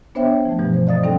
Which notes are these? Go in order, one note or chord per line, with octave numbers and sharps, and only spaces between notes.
B3 D4 C5 C#5 E5 G5
F3 A3
G2 B2 E3 F3
C5
D5 D#5 F5 D#6 A6
G3 C4 D4 D#4 A4 G5